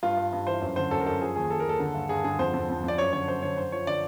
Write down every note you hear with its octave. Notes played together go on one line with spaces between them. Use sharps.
G2 F4
G2
G2
E3 C5
F#2
D3 C5
F#2 A4
A#4
F#2 A4
F3 G#4
D#2 G#4
D#2 A4
A#4
D#2 A4
D3
G2
G2 G#4
D3 G#4
F2 C5
F2
F2
F2 D5
F#2 C#5
D3 C#5
F#2 C5
D3 C#5
D3 C5
F3 C#5
D3 D5